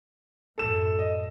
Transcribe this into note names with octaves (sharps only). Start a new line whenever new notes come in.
F#2 A2 A4 E7
D#5